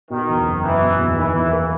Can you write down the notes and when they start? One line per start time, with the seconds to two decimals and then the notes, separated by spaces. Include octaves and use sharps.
0.10 B2 D#3
0.29 E2
0.46 F#1
0.63 F#1 E3
0.81 B2
0.99 E2
1.16 D#3 E3
1.33 E2
1.52 A#3